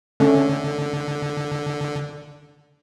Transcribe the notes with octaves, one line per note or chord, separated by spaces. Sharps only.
D3 A3 C#4